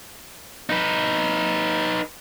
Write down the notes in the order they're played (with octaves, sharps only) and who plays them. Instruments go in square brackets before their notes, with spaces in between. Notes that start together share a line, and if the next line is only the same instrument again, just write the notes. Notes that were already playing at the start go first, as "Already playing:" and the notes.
[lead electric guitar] D#4 B4